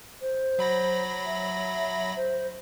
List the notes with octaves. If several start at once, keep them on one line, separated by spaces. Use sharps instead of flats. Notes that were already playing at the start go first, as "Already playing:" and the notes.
C5
F#3 B5 A#6
E5
C5